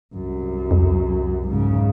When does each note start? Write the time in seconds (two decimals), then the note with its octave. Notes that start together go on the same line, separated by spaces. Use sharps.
0.13 C2 F#2
0.71 F2
1.48 G#2 C#3